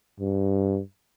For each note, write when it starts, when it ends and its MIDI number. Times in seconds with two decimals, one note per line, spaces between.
0.20 0.80 43